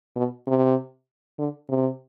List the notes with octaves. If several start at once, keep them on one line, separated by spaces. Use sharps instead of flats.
B2
C3
D3
C3